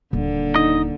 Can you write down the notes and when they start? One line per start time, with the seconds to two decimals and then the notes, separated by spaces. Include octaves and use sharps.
0.13 D#1 D3 A#3
0.56 D#4 D#5